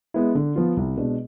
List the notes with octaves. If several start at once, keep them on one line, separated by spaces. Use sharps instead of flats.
G#3 B3 E4
D3
F3 B3 F4
C2
B2 G#3 D4